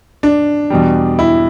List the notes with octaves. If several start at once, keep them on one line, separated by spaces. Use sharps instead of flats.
D4
E2 B2 G3
E4